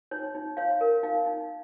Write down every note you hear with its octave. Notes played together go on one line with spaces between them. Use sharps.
D#4 C#5
D#4
C#5 F5
A#4
D#4 F5
D#4